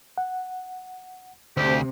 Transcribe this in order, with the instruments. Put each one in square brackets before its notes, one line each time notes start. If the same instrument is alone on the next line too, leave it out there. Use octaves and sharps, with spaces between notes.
[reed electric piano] F#5
[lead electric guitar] D2 [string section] C3 [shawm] G4 [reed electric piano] C5